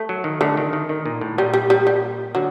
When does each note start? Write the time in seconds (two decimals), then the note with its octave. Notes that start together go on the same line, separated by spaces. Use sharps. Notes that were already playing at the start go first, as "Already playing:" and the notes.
Already playing: A3
0.09 F#3
0.24 D#3
0.41 D3 A3
0.57 D#3
0.73 D#3
0.89 D#3
1.06 A#2
1.21 A2
1.38 A#2 G3
1.54 G3
1.70 G3
1.87 G3
2.35 D3 F#3